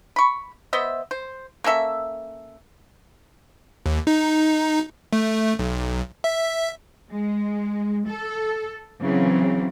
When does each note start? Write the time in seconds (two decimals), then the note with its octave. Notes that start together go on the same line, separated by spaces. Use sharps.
0.16 B5 C#6
0.73 B3 C5 D#5 E5
1.11 C5
1.64 A#3 C#4 A4 E5
3.86 D#2
4.07 D#4
5.13 A3
5.59 B1
6.24 E5
7.11 G#3
8.07 A4
9.00 C#3 E3 F#3 C4